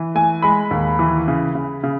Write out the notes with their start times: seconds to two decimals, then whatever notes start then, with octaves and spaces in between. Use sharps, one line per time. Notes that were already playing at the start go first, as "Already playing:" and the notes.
Already playing: E3
0.15 A3 G#5
0.42 G#3 B5
0.71 D#2
0.99 E3
1.28 C#3
1.55 C#3
1.84 C#3